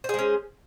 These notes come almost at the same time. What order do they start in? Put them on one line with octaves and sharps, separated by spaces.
C5 G#4 G#3 C#4